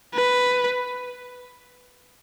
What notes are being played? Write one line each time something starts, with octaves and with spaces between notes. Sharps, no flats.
B4